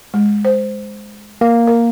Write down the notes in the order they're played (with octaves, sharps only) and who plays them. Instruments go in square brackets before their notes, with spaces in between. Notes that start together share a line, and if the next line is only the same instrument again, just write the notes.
[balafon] G#3
C5
[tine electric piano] A#3
[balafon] A#4